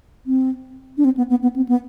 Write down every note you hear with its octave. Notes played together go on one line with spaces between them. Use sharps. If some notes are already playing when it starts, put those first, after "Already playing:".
C4
D4
C4
B3
B3
B3
C4
B3